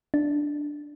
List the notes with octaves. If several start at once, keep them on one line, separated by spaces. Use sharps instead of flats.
D4